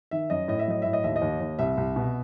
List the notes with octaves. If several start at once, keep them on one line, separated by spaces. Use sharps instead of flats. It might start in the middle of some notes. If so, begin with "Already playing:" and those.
D#3 E5
F#2 D#5
A2 D#5
E5
F#3 D#5
A2 E5
D#5
D#2 E5
D#5
D#2
D#2
C2 E5
C2
B2